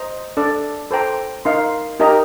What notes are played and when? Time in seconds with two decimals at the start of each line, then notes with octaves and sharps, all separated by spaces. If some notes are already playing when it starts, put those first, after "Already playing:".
Already playing: C5 D#5 A#5
0.37 D4 A4 D5
0.91 A4 C5 G5 A#5
1.45 D#4 A#4 F5 C6
2.00 D#4 G4 A#4 D#5 A#5